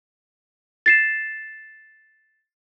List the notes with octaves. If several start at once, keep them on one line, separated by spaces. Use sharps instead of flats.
A6 C7 E7